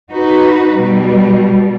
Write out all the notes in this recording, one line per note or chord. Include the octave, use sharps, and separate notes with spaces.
D#4 F#4 B4
B2 G3